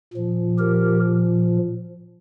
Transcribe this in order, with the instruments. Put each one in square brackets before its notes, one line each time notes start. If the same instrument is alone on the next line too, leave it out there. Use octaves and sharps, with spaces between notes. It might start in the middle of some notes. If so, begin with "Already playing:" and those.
[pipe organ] A#2 F3
G4 A#4